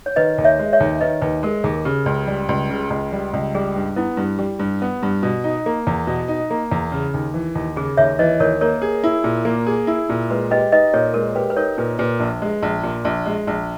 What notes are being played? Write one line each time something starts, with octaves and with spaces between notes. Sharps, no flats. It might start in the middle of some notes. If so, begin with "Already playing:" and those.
C#5
D#3 B4 D#5
D#2
C#5 E5
G#3
C#5 E5
D#2
D#3 B4 D#5
D#2 B4
G#3 A#4
D#2 G#4
C#3 G4
C#2
G3
C#2
C#3
C#2
G3
C#2
G3 G#4
G2
B3 E4
G2
G3 G4
G2
B3
G2
B2
D#4
A#3
E2
B2
D#4
A#3
E2
C#3
D#2
E3
D#2
C#3 G#4
D#2 C#5 E5
E3 B4 D#5
D#2 A#4 C#5
A#3 A#4 C#5
G#4
E4
A#2
A#3
G#4
E4
A#2
G#3 B4
G4 B4 D#5
D#4 B4 D#5
A#2 A#4 C#5
G#3 A#4
G4 B4
B4
D#4 A#4 C#5
A#2 B4
A#2 B4
A#1
G#3
A#1
A#2
A#1
G#3
A#1